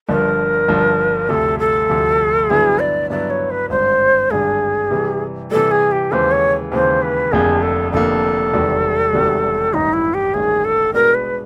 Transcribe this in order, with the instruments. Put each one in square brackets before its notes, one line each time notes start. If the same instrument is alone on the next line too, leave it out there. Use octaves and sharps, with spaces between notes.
[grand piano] G1 G2 D3 F3 [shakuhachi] A#4
[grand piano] G1 G2 D3 F3
[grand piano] D2 C3 F3 [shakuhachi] A4
[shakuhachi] A4
[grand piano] D2 C3 F3
[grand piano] G2 D3 F#3 B3 E4 [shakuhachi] G#4
[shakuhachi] D5
[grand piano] G2 D3 F#3 B3 E4 [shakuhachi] D5
[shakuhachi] C#5
B4
[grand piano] G#1 G2 D3 [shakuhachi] C5
[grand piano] G#1 G2 D3 [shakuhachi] G#4
[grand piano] C3 E3 G3
[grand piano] C3 E3 G3 [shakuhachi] A4
[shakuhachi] G#4
G4
[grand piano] D#2 C#3 E3 G#3 [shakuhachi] C5
[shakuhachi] C#5
[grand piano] D#2 C#3 E3 G#3 [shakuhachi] C5
[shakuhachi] B4
[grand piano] F1 F2 D3 F3 A#3 [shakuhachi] G#4
[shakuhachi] A4
[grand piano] F1 F2 D3 F3 A#3 [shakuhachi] A4
[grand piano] E1 E2 C3 D#3 G3
E1 E2 C3 D#3 G3
[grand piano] A1 G2 D#3 [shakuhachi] D#4
[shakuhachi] E4
G4
[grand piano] A1 G2 D#3 [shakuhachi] G#4
[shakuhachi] A4
[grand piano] B2 G#3 B3 D4 [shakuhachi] A#4
[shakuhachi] B4